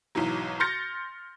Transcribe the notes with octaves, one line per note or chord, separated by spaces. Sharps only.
B1 G#2 E3 F#3
C6 F6 G6 A6 A#6 C#7